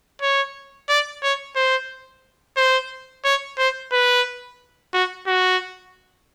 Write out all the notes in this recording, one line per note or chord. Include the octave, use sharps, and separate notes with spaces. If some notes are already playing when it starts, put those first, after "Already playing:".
C#5
D5
C#5
C5
C5
C#5
C5
B4
F#4
F#4